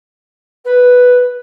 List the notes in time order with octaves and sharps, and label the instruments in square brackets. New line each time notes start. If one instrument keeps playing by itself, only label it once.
[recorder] B4